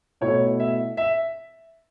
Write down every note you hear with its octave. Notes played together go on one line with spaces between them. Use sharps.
B2 A3 E4 C#5
E5
E5